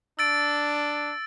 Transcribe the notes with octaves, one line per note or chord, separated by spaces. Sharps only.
D4 E6 A6 D7